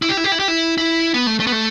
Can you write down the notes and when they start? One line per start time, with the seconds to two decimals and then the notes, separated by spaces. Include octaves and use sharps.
0.02 E4
0.09 G4
0.17 E4
0.24 G4
0.32 E4
0.40 G4
0.48 E4
0.78 E4
1.14 B3
1.27 A3
1.40 A3
1.47 B3
1.52 A3